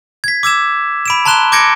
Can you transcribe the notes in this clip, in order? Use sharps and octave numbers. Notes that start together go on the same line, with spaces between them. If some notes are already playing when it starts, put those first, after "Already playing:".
G#6 B6
D6 E6 G#6 E7
B5 D7 E7
A5 A#5 C6 F#6 E7 G7
D6 G6 G#6 A#6 C#7 D7